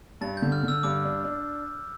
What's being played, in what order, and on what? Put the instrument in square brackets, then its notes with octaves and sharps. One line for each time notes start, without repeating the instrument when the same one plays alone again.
[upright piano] G2 [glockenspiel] A6
[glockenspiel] G6
[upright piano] D3
[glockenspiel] F6
[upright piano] D3
[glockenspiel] E6
[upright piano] G2 [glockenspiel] D6
[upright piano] D4
D4